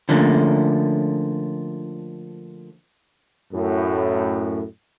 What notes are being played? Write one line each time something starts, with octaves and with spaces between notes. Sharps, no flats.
D3 F3 A3 A#3 C#4
F#2 A2